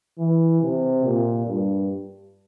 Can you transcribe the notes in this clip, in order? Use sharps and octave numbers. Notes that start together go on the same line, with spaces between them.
E3
C3
A#2
G2